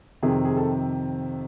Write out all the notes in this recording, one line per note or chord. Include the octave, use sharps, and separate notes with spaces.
F2 C3 D#3 G#4
G#4
A4